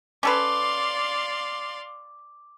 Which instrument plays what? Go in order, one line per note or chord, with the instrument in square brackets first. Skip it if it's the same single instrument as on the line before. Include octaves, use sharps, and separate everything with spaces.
[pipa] C#4 A4 B4 [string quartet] D5 F5 C6 [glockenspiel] D6